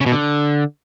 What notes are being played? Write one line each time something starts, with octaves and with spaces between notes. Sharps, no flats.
C#3
B2
D3